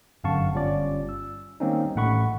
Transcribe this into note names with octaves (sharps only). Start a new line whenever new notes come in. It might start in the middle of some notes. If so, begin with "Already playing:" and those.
G1 F#2 F5 F#5 A5 C#6
G1 G3 C#4 F4 D5
E6
D#3 G3 A#3 C4 C#4 D#4
A1 A3 F#5 B5 C#6